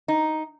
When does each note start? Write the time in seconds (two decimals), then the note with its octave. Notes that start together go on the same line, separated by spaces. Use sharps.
0.08 D#4